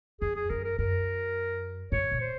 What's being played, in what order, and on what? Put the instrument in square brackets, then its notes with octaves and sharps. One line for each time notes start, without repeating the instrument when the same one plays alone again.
[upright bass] F2 [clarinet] G#4
[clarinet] G#4
[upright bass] F#2 [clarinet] A#4
[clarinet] A#4
[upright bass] F#2 [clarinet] A#4
[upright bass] G#2 [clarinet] C#5
[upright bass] A#2
[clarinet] C5